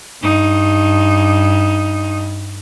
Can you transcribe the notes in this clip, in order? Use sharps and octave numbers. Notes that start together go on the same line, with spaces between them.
G2 D#4